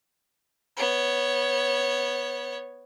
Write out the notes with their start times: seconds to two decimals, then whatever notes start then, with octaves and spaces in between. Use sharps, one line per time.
0.77 B3 C#5